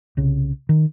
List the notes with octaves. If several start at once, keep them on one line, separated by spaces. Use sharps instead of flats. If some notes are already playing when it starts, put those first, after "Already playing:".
C2 C#3
D#3